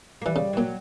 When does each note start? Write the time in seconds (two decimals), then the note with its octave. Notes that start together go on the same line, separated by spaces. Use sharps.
0.22 A#3
0.26 E3 G3
0.36 C#3
0.53 E3
0.57 A#2 F#3